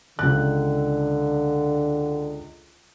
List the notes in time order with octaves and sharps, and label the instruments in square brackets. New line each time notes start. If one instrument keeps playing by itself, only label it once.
[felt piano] C#2 F#6 [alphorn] D3